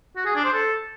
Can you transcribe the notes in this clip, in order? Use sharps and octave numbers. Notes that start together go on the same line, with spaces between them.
F#4
G#4
D4
C5
A4